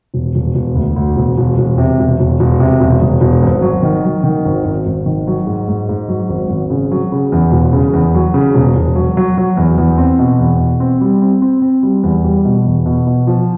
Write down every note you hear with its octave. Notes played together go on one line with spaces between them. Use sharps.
E1
E1
E1
D2
D2
E1
E1
E1
C3
E1
E1
E1
C3
E1
E1
E1
G#1
F#3
D#3
F#3
D#3
G#1
G#1
G#1
D#3
F#3
G#2
G#2
G#2
F#3
G#1
G#1
C#3
F#3
C#3
E2
E1
C#3
E2
F#3
C#3
E1
E1
F#3
F#3
F#3
E2
E2
C4
B2
E2
B2
C4
G3
C4
C4
C4
G3
E2
G3
B2
E2
B2
B2
F3